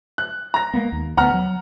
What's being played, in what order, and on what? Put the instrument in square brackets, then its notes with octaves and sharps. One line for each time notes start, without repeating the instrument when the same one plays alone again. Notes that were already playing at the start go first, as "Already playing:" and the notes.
[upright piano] F#6
A#5 A#6
[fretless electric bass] G#3 A#3 B3
D#2
[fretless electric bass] D2 B3 [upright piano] F#5 A#5 F6
[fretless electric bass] F#3